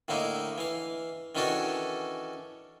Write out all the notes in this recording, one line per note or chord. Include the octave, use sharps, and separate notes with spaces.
A2 D3 A#3 D#4 E4
E3 F5
D#3 E3 C#4 D4 F#4 A4